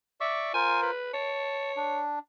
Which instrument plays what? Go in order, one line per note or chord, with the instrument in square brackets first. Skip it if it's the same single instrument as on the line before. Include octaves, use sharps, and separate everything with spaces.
[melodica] D5 C#6 D6 [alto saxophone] E5
[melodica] F4 A#4 C5 [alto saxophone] G#5
[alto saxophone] B4
[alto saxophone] C#5 [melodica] A5
[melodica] D4